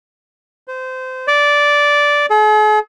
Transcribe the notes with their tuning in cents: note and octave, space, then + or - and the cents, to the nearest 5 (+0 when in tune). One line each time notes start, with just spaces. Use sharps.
C5 -25
D5 -10
G#4 +45